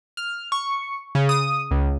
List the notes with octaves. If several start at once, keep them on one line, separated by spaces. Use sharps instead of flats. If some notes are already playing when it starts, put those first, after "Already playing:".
F6
C#6
C#3
D#6
C#2